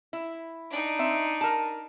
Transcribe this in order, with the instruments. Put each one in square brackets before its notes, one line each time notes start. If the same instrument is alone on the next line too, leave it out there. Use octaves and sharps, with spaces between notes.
[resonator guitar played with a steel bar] E4
[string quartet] D4 D#4
[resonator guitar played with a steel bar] C4 E5
A#4 A5